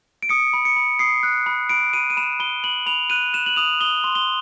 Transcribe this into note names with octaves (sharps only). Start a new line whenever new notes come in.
D7
D#6 C#7
B5
C#7
B5
D#6 C7
F#6
B5
B5 D7
B5 D#7
D#7
B5 E7
B5 G7
B5 F#7
B5 F7
F#6 D#7
F#6 E7
F#7
D#6 F7
D#6 G7
C6
G7